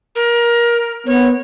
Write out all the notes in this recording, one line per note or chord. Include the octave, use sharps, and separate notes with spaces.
A#4
B3 C#5